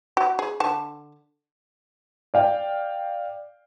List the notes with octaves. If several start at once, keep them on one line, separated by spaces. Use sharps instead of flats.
F#4
G#4
D3 A5
D5 F5 G5